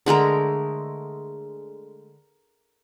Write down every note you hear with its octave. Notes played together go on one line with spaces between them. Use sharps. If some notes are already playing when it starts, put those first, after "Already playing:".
D3 G#3 A3 A#4